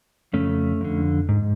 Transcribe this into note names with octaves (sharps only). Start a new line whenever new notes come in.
F2 C#3 A3 C#4
F2 D3
G#2